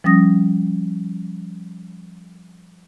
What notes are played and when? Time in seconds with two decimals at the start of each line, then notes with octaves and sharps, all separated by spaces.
0.04 F3 G3 C#4 D#6 A#6